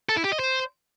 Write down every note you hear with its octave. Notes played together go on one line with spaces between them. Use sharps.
A4
E4
G4
D#5
C5